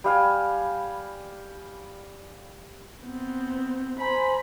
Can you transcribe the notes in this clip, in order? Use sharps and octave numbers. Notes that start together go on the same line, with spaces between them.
G3 F5 G#5
B3 C4
C5 G#5 A#5 B5